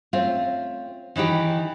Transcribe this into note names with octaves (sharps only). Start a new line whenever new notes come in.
A3 C4 C#4 F4
D#3 E3 D#4 G4